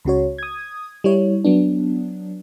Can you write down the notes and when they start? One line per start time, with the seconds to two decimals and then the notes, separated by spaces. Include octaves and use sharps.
0.05 C#2 C#3 F#4 C#5
0.38 D#6 G#6
1.04 G3 E4 C#5
1.45 F#3 B3 D4